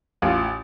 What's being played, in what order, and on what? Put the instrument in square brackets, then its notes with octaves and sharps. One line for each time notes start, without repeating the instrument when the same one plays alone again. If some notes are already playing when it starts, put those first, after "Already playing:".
[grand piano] A1 F4